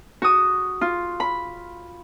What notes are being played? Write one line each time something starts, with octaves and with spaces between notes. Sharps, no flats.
F#4 D#6
F4
B5